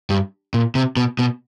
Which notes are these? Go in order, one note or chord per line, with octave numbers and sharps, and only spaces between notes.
G2
A#2
C3
B2
B2